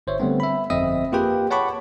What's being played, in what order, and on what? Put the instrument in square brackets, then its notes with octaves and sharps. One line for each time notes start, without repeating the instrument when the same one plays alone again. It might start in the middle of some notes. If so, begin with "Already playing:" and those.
[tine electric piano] G1 C5 C#5 E5
D3 G3 A3 B3 C4
E5 B5
G1 F2 C4 D#5 E5 D#6
A#3 F4 G4 G#4 B4 G5
C#5 F#5 A5 B5 C#6 D6